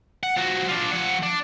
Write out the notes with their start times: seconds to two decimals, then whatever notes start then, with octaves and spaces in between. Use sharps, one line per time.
0.23 F#5
0.36 F3 F#4
0.68 D4 F4
0.92 F3 F#5
1.23 D4